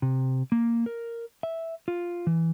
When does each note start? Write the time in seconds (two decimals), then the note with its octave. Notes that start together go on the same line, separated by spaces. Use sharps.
0.02 C3
0.52 A#3
0.86 A#4
1.43 E5
1.88 F4
2.27 E3